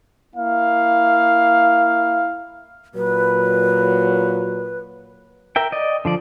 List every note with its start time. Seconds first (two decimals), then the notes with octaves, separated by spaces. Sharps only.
0.36 A#3 E4 F5
2.95 A#2 F#3 B4
5.56 A#4 E5 G5
5.72 D5 D#5
6.05 D3 F3 D5